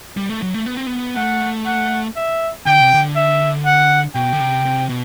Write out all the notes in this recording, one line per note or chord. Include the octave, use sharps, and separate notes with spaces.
G3
A3
F#3
A3
B3
C4
B3
A3 F#5
F#5
E5
D3 G5
C3
D3
E5
F#5
B2 G5
D3
C3
C3
B2